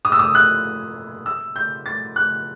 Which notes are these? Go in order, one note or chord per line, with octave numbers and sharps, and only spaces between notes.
D#6
E6
D#6
F#6
E6
G6
A6
F#6